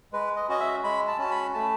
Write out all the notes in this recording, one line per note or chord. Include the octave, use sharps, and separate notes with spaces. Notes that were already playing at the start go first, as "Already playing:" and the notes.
G#3 B4
D#5
C#4 F#4 D#5
E5
G#3 B5
A5
C#4 F#4 A5
B5
A3 A5